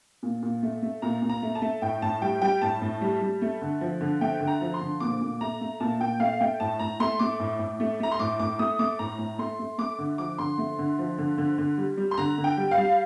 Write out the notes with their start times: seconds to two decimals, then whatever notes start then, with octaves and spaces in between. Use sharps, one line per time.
0.23 A#2
0.42 A#2
0.63 A3
0.82 A3
1.02 A#2 A#5
1.22 A#2
1.29 A#5
1.42 A3
1.55 A5
1.62 A3
1.82 A2 G5
2.02 A2 A5
2.22 G3 G5
2.42 G3 G5
2.62 A2 A5
2.81 A2
3.01 G3
3.21 G3
3.42 A3
3.62 D3
3.81 F3
4.01 D3
4.21 A3 G5
4.40 D3
4.47 A#5
4.61 F3
4.74 C6
4.81 D3
5.00 A#2 D6
5.21 A#2
5.41 A3 A#5
5.61 A3
5.80 A#2 A5
6.00 A#2 G5
6.20 A3 F5
6.41 A3 G5
6.60 A2 A5
6.79 A2 A#5
7.00 A3 C6
7.19 A3 D6
7.39 A2
7.59 A2
7.80 A3
8.00 A3 A#5
8.11 C6
8.20 A2 D6
8.39 A2 D6
8.59 A3 D#6
8.79 A3 D6
8.99 A2 A#5
9.19 A2
9.38 A3 C6
9.59 A3
9.78 A3 D6
9.98 D3
10.18 F3 D6
10.38 D3 C6
10.58 A3
10.79 D3
10.99 F3
11.18 D3
11.38 D3
11.58 D3
11.78 G3
11.97 G3
12.11 C6
12.18 D3 A#5
12.38 D3
12.44 G5
12.57 G3
12.71 F5
12.77 G3